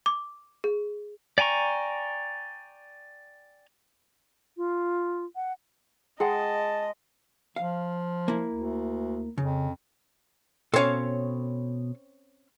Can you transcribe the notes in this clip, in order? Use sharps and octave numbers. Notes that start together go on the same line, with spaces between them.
D6
G#4
D5 G5 G#5 A#5 C#6
F4
F#5
G#3 G#4 D#5 F#5 G5 A5
F3 F5
A#3 E4
D2
F2 C#3
B2 C4 C#4 A4 C#5 F5